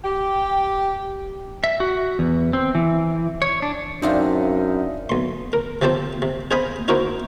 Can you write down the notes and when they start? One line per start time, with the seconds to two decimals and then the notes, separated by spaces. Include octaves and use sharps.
0.04 G4
1.64 E5
1.80 F#4
2.19 E2
2.53 C4
2.75 E3
3.42 C#5
3.62 D4
4.02 F#2 C4 D4 D#4 F4 E5 F5
5.09 B1 C6
5.53 A#4
5.82 C3 F3 G4 A4 C5
6.22 C3
6.51 G#4 C5 D#5 F5 G#5 B5
6.88 D#4 E4 F#4 A#4 C5